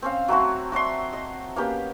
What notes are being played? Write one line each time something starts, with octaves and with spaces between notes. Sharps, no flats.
C4 C#4 F5
F#3 A3 C4 F#4
F#4 D5 E5 C6
D#5 C6
A#3 B3 C#4 G4